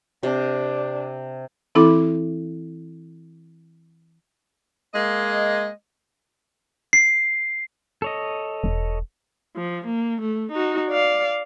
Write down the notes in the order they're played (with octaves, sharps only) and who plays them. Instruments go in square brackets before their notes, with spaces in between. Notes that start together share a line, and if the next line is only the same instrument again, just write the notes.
[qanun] C3 [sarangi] D4
[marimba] E3 C4 E4 A4 B5 D6
[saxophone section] G#3 A#3 D#5
[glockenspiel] C7
[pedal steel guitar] A4 C#5 D#5
[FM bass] E1
[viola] F3
A#3
A3
D#4 F#4
D5 F5